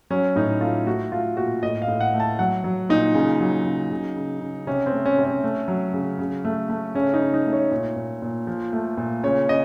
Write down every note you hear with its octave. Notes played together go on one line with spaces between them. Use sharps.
F#3 C#4
A2 D#4
A3 F4
A3 F#4
A3 F4
A#2 F#4
A2 D#5
F5
A2
F#5
A3
A5
F#3 F#5
F#3
A#2 D#4
C#3
F#3
C#3
C#3
C#3
C#3
C3 C#4
C4
A3
C#4
C3
C#4
A3
F#3
C#3
C#3
A3
A3
C#3 C#4
D#4
C#3
D#4
A3
C#5
A#2
A#2
A#2
F3
A3
A#2
C#3 C#5
C#3 D#5